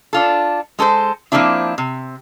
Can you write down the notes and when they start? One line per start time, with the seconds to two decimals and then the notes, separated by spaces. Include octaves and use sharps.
0.13 D4 F4 A4
0.79 G#3 A4 B4 C5
1.32 F3 F#3 A#3 C4 D4 E4
1.78 C3